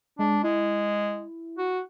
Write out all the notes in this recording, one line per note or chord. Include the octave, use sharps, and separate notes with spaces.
G#3 D4
G#3 E4
F#4